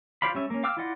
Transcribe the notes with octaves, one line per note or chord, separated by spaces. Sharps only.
F4 C5 D5 F5 B5
G3 C#4 E5
A#3 C#4
F5 G5 D6 E6 F6
E4 F4 D5 D#5 F#5